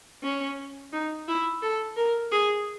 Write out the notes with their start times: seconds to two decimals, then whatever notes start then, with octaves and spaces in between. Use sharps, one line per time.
0.23 C#4
0.92 D#4
1.28 E4
1.62 A4
1.97 A#4
2.32 G#4